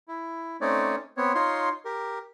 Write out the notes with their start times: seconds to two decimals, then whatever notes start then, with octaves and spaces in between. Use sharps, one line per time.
0.08 E4
0.61 A3 C4 C#4 D#4 C#5 D5
1.17 B3 C4 C#5
1.35 D#4 F4 C#5 C6
1.85 G4 A#4